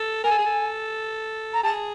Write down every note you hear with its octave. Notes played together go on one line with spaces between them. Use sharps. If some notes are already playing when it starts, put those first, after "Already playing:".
Already playing: A4
A#4 G#5
A4
G#4
A4
A#5
G#4 A5